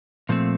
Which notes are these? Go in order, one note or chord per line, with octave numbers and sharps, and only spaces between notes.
A#2 F3 A3 C4